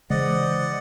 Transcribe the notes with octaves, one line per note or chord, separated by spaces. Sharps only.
C#3 E3 G#3 C5 D5 D#5 F#5